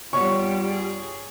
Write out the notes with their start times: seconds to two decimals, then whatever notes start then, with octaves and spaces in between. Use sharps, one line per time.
0.13 G2 G3 B3 F4 C#5 C#6
0.68 G#4